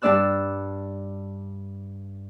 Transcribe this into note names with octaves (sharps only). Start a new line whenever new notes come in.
G2 G3 D4 D5 E6 F#6